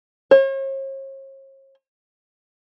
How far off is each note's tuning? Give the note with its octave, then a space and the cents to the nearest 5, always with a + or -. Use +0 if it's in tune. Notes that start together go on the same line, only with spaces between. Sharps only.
C#5 -45